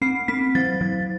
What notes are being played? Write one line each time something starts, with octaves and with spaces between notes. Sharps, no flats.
C4 C7
C4 B6
F#3 A6
F#3